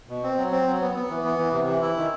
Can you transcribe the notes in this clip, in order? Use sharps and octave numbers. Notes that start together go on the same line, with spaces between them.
B2
C4
F#3
C4
F#3
B3
B3
E3
B3
E3
C3
E3
E4
D#3